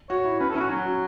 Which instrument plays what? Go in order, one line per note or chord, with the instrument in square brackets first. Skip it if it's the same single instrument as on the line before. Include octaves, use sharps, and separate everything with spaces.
[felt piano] F#4 [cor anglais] C#5
[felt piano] E4
[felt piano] C#4 [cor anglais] B4
[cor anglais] A4
[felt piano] C#4 [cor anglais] E4
[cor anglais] F#4
[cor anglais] F#3 [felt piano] C#4
[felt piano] F#4